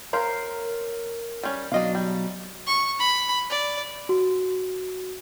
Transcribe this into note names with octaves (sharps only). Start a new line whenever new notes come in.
A#4 C5 C#5 F5 A#5
G3 C#4
B2 F#3 D4 D#5 F5
G3
C#6
B5
D5
F#4